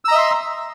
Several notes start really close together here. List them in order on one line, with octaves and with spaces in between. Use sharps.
E6 A#5 D#5 E5 C6